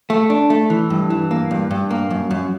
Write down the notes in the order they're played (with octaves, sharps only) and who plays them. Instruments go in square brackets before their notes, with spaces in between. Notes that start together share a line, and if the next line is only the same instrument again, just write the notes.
[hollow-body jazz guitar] A3
D4
A3
E3
G2
E3
A#3
G2
G2
A#3
F#2
F#2